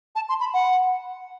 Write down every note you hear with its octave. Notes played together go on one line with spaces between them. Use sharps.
A5
C6
B5
F#5